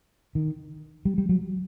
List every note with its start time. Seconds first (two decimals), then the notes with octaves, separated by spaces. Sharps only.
0.35 D#3
1.05 G3
1.18 G3
1.29 F#3